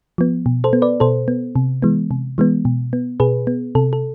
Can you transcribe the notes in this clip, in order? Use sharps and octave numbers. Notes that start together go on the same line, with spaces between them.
F3 B3
B2
A4 C5
B3
B4 D5
B2 A4 C5
B3
C3
E3 G#3 B3
C3
E3 G#3 B3
B2
B3
B2 G#4 B4
B3
C3 A4
A4